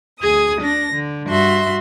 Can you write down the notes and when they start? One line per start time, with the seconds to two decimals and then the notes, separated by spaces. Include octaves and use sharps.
0.19 D2 G#4 D#6
0.59 D4 A#6
0.94 D3
1.28 G2 F#4 E5 C6